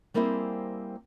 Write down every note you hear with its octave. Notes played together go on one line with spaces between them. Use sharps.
G3 A#3 C4 E4 G#4 C5